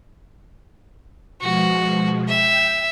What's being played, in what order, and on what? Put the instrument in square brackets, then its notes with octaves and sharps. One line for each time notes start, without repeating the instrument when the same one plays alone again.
[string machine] B2 F3 G#3 [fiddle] F#4
[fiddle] E5 [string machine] G5